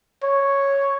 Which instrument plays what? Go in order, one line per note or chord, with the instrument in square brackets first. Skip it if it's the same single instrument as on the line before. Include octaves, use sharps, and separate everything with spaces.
[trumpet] C#5